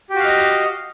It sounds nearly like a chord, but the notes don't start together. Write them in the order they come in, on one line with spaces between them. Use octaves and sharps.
G4 F#4 F5 D#5